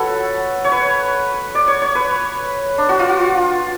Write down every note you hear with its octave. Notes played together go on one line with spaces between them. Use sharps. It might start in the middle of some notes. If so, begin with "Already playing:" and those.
Already playing: F#4 A4 B4 C#5
C#5
B4
D5
C#5
C#5
B4
D4
F#4
F4
F#4
F4